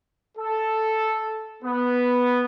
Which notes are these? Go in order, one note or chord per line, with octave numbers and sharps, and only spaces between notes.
A4
B3